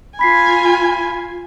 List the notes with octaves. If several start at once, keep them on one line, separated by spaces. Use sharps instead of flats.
F4 G#5 B5 B6 C7